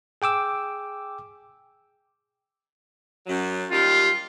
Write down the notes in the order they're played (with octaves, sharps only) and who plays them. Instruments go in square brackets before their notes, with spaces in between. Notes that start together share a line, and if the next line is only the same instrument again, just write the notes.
[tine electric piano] G#4 G5 D6 E6
[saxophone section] F#2 F#3
[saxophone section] D#2 G3 G4 [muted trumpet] F4